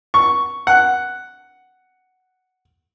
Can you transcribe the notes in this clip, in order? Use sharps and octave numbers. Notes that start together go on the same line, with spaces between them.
C#6
F#5